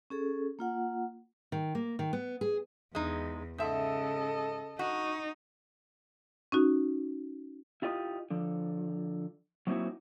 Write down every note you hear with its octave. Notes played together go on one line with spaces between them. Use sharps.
C#4 G#4 A4
A#3 F4 F#5
D#3
A#3
D#3
B3
G#4
E2 G#3 D#4
G#2 C#3 A4 D#5 E5
D#4 F#4
C#4 D#4 F#4
E4 F4 G4 D#5
D3 F3
F#3 A#3 C4 D#4 E4 F#4